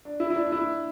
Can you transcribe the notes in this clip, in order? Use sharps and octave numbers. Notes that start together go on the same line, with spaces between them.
D4
E4
E4
D4
D4
E4